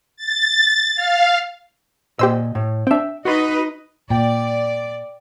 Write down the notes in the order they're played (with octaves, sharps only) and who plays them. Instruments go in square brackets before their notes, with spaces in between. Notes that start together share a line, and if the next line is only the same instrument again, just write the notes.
[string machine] A6
F5
[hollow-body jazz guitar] A#2 D#5 [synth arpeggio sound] G4 C5 E6
[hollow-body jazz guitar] A2
[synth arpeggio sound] C4 D4 [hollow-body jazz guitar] E5 G5
[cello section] D#4 B4 D#5 [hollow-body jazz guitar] F#4 C6
[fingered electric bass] A#2 [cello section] D5 [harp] G5